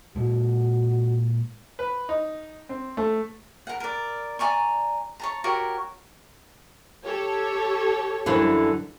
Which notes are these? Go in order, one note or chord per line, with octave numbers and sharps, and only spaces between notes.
A#2 G#3 F#4
B4
D#4
C4
A3
A#4 F#5
A#4 D5
D5 G#5 A#5 C#6
C#5 A5 A#5
F#4 G4 A#4 C#5
G4 A4 C#5
F#2 D3 E3